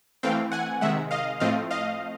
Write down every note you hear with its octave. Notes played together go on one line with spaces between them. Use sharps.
E3 A3 C4 F5 G5
F#5 G#5
C3 D#3 G#3 E5 F#5
D#5 F5
A2 F3 A3 C4 D#5 F5
D#5 F5